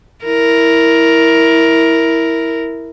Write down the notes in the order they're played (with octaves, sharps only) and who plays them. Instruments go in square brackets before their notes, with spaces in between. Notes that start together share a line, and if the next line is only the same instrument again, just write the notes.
[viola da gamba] E4 A#4